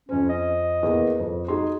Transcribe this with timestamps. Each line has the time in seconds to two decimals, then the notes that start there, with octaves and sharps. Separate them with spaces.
0.09 F2 C#4 C5
0.29 D#5
0.83 E2 A#3
1.19 F2
1.48 D#4 F#4 G#4 C6